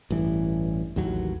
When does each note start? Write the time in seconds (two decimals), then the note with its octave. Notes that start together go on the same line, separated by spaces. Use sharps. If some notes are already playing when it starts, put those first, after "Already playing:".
0.10 A1 G2 E3
0.96 A1 D#2 F#3